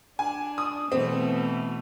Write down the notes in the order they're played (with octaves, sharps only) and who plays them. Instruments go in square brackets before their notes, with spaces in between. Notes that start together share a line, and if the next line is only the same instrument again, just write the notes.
[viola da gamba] D4 [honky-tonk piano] G#5
[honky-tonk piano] D#6
[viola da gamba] B2 E3 A3 [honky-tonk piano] C4